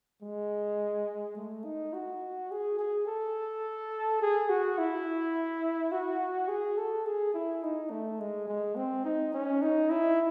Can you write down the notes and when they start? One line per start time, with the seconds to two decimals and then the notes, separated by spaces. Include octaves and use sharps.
0.23 G#3
1.37 A3
1.65 D#4
1.93 F#4
2.51 G#4
2.79 G#4
3.07 A4
4.22 G#4
4.49 F#4
4.78 E4
5.92 F#4
6.48 G#4
6.77 A4
7.05 G#4
7.34 E4
7.63 D#4
7.91 A3
8.20 G#3
8.48 G#3
8.76 C4
9.05 D#4
9.34 C#4
9.62 D#4
9.90 E4